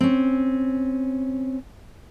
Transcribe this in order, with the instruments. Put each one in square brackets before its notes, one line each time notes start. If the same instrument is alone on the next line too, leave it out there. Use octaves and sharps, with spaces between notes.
[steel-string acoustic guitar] C4 C#4